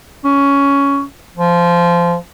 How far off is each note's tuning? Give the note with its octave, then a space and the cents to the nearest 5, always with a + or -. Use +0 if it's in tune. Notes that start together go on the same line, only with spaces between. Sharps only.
C#4 +10
F3 -15